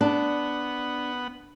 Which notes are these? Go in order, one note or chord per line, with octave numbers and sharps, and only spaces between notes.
B3 D4 F#5